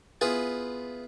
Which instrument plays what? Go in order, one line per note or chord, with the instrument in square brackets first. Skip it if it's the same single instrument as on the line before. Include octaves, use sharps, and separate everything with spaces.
[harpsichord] B3 E4 F4 G#4 B4